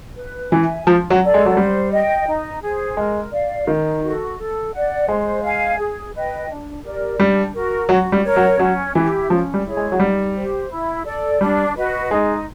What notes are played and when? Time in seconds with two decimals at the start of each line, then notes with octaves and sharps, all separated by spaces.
0.16 B4
0.52 E3 E5 G#5
0.87 F3 F4
1.10 F#3
1.21 A4 D5
1.34 G#3
1.46 F#3
1.57 G3 C5
1.92 D#5 G5
2.27 D#4
2.63 G#4 C5
2.97 G#3 A#4
3.32 D5 F5
3.67 D#3 D#4
4.03 F#4 A4
4.38 A4
4.73 D5 F#5
5.08 G#3 C5
5.43 F5 G#5
5.78 G#4
6.13 B4 D#5 G5
6.49 D4
6.83 G4 A#4 D5
7.19 G3 D4
7.54 F#4 A#4
7.89 F#3 F#4
8.12 G3
8.25 A#4 C#5
8.36 F#3
8.59 F#3 C#4
8.95 E3 E4 G4
9.30 F3 C#4
9.54 G3
9.65 E4 G#4 C#5
9.77 G#3
9.92 F#3
10.00 G3 D#4
10.35 G4 C5
10.70 E4
11.05 A4 D5
11.41 G3 D4
11.76 F#4 B4 D#5
12.10 G#3 D#4